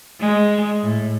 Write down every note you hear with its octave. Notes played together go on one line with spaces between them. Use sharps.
G#3
A2